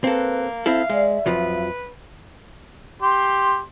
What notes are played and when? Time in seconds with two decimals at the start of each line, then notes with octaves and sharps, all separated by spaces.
0.04 A#3 C4 A4 B4
0.66 C4 E4 A4 E5 F5
0.90 G#3 D5
1.26 F2 D#3 F3 F#3 F4 B4
3.02 G4 C6